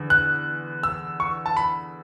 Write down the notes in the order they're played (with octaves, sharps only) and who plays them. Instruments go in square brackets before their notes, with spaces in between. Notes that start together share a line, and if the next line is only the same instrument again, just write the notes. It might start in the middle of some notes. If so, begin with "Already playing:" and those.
Already playing: [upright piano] E2 D3
[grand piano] F#6
E6
C#6
A5
B5